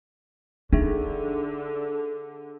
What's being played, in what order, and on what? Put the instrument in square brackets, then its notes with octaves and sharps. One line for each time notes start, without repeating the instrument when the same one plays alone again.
[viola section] D3 [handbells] D4 G#4 E5 [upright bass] D#4